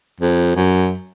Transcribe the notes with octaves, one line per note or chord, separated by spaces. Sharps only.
F2
F#2